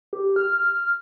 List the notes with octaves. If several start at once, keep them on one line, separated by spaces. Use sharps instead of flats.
G4
F6